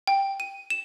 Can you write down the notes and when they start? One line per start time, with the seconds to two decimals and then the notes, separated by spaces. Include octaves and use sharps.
0.07 G5
0.40 D#7
0.70 E7